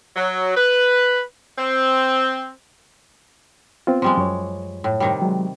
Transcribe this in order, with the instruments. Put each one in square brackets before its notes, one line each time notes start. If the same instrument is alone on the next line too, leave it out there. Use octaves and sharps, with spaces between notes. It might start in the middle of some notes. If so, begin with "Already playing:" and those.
[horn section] F#3
B4
C4
[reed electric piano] B3 C4 F4
[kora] F3 G3 G#3
[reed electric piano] F#2 C#5
[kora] A2
C3 D#3 G3
[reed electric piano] F#3 G#3